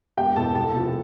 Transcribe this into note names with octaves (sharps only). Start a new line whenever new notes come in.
E1 G4 G5
E2 B2 A4 A5
C2 A4 A5
C3 F3